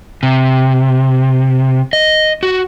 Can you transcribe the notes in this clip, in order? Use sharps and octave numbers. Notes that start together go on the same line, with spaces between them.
C3
D#5
F#4